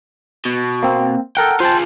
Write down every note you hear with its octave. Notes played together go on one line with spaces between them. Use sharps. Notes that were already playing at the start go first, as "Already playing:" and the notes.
B2
A#3 C4
A4 A#4 F#5 G5
F4 G#4 C5 G5 A5